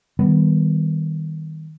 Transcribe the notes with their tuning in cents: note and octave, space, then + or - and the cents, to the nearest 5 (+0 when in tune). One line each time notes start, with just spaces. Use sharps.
D#3 +20 G3 +5 B3 +0